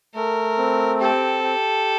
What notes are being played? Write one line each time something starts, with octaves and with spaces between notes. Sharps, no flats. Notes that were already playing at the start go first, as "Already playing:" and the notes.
A3 A#4
C4
G4 A4
G4